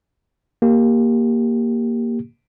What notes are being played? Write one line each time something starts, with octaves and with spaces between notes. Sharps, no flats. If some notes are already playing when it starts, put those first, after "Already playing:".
A#3 G4